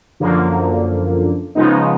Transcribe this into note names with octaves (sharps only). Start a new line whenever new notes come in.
F#2 D3 F3 A#3
C#3 F3 G#3 B3 D#4